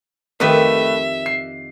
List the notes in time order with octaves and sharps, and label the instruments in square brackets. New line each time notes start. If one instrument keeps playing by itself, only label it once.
[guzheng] F2 D#3 G4 [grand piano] A3 B4 B6 [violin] E5
[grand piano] C7